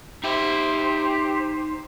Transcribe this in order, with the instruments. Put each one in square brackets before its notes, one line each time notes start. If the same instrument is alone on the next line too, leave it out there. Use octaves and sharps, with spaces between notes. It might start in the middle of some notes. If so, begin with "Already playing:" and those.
[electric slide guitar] D#4 E5 [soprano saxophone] G4 [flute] C5